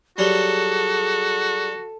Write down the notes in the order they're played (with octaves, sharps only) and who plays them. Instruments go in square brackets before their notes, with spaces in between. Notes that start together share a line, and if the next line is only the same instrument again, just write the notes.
[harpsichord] F#3 G3 [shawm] F#4 [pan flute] G#4 [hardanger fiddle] A4